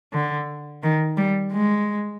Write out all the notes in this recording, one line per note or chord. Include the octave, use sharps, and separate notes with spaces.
D3
D#3
G3
G#3